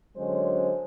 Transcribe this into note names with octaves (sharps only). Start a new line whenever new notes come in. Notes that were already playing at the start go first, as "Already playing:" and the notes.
D3 F#3 G#3 C#4 C5